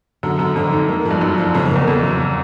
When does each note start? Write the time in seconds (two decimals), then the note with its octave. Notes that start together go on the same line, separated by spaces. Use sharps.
0.23 F#2 D3
0.39 F#2 D3
0.55 F2 D3
0.72 D#4
0.89 A#3
1.05 F3
1.11 G2
1.21 F#2 D#4
1.38 F3
1.54 F2 C#3
1.65 F2
1.71 E2 A#3
1.88 F2 C#3
2.03 F#2 C#3